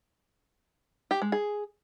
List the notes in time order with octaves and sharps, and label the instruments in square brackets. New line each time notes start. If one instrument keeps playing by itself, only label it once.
[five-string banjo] G4
G#3
G#4